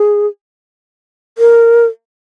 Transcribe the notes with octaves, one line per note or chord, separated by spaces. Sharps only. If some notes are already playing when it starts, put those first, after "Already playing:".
Already playing: G#4
A#4